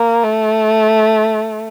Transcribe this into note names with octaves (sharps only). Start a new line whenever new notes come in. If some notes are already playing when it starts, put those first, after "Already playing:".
Already playing: A#3
A3